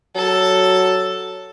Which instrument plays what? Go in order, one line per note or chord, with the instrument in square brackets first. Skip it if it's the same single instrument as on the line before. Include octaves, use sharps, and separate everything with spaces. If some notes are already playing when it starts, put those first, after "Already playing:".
[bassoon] F#3 [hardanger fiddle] A4